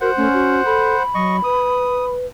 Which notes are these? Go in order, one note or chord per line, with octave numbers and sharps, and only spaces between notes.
F#4 A#4 C5 F#5
A3 C#4
F#4
A4 B5
F#3 D#5 C#6
B4 D#6